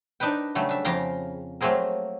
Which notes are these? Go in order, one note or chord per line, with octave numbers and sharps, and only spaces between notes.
D4 D#4 A#4 B4 G5
C#3 F#3 G3 A3
D4 E5
F2 C#3 G4 F5 G5 A#5
F#3 A3 A#3 C4 G#4 A#4